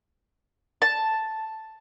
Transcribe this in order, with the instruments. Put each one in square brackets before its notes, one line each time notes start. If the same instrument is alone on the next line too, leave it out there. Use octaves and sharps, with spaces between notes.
[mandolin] A5